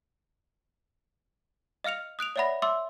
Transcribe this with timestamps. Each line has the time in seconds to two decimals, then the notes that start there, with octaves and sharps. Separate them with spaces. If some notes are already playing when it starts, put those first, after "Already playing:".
1.84 D#5 F5 F6 C#7 F7
2.19 D#6 F#6 D7 F7
2.36 C#5 D5 E5 F#5 B5 A#6
2.62 E5 C6 D6 E6